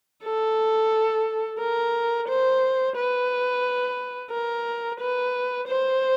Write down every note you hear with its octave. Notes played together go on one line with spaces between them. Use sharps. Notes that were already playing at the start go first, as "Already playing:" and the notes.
A4
A#4
C5
B4
A#4
B4
C5